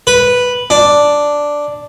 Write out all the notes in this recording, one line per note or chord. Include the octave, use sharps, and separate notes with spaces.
B4
D4